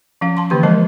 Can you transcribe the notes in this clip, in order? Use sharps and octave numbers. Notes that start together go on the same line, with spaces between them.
F3 C#4 F5
A5 C6
D3 E3 A#3 G4 B4 C6
F3 G#3 A#4 C5 D#5 A5